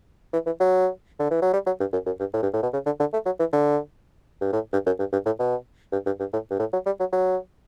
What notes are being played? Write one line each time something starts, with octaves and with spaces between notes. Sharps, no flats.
E3
E3
F#3
D3
E3
F#3
G3
F#3
G2
F#2
F#2
G2
A2
G2
A2
B2
C#3
D3
D3
A3
F#3
E3
D3
G2
A2
G2
F#2
G2
G2
A2
B2
G2
G2
G2
A2
G2
A2
F#3
G3
F#3
F#3